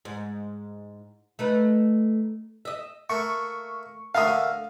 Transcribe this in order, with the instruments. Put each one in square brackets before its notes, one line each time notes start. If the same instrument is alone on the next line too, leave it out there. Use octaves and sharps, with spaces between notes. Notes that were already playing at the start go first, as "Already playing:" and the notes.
[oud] G#2
A3 D#4 B4
D#5 E5
[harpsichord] A3 A#3 [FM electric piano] C#6
[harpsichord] D3 A3 A#3 [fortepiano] F5 D#6